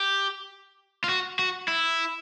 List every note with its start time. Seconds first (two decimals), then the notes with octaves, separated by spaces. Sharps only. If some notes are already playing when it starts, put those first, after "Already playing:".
Already playing: G4
1.04 F4
1.09 F#4
1.39 F#4
1.68 E4